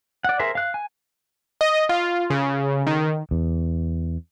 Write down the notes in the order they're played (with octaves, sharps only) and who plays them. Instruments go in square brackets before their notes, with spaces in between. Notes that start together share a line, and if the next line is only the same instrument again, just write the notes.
[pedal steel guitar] D5 F#5
G#4 A#4 C5 E5
F5 F#6
G#5
[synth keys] D#5
F4
C#3
D#3
[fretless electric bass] E2